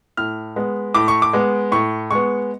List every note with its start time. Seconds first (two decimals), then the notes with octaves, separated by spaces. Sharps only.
0.17 A2 F6
0.56 G#3 B3
0.94 A2 D6
1.08 C#6
1.22 D6
1.33 G#3 B3
1.72 A2 C#6
2.11 G#3 B3 C#6